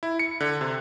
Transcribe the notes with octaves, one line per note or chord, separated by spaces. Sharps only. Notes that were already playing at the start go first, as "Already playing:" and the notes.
E4
C#7
D3
C3